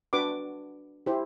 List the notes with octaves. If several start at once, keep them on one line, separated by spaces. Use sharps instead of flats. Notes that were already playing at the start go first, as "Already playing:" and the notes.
D4 F#4 B4 D6
E4 G4 C5